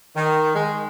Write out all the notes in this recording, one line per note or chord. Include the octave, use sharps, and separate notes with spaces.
D#3
G#3